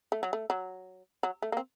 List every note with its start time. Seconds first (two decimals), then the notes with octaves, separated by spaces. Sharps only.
0.12 A3
0.23 F#3
0.33 A3
0.50 F#3
1.23 F#3
1.42 A3
1.52 A#3
1.57 C4